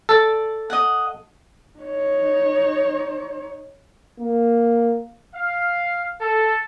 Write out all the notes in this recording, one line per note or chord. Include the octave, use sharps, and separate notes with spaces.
A4 D5 A5
D#5 F#5
D#4 C#5
A#3
F5
A4